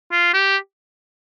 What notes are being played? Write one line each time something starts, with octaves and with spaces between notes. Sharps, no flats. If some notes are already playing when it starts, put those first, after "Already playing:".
F4
G4